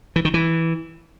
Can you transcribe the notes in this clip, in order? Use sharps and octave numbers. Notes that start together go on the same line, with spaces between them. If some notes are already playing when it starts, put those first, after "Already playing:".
E3
D#3
E3